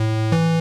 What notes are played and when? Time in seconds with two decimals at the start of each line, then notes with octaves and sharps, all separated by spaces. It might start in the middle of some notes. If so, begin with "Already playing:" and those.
Already playing: A2
0.32 E3